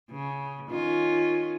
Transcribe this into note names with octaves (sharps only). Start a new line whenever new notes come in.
C#3
D#3 C#4 F4